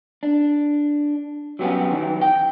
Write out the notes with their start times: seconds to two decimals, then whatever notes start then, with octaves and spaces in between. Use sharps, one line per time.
0.23 D4
1.59 F#3 G3 B3 C#4 G4
1.92 D#3 E3 F#3
2.21 G5